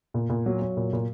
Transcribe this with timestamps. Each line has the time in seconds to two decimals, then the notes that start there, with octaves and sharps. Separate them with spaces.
0.14 A#2
0.29 A#2
0.46 F#3
0.62 F#3
0.77 A#2
0.93 A#2